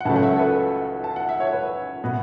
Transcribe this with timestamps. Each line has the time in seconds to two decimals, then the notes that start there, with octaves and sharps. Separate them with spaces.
0.01 F#5
0.05 C#2 C#3 F#3 A3 A5
0.16 F#5
0.23 E5
0.33 A4
0.39 B4
1.04 A5
1.16 F#5
1.29 E5
1.40 C#5
1.53 B4
2.04 B2 B3